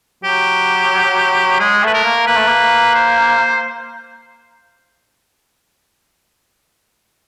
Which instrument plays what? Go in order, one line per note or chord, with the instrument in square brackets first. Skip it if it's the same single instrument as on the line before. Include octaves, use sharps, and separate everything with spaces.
[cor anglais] F#3 [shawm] G4
[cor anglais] G#3 [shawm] G#4
[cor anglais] A3 [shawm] B4
[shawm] A#4
[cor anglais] A#3
[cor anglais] A#3 [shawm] B4
[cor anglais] A3
A#3
[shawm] C5